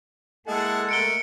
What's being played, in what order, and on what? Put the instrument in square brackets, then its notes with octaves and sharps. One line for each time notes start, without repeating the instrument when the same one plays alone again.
[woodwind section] G#3 A4 [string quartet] A#3 F#5 [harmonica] E4 G#4 A5
[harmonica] A3 A#4 [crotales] C#7 D7 G7